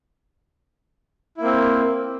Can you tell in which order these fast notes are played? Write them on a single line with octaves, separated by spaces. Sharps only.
E4 A#3 C4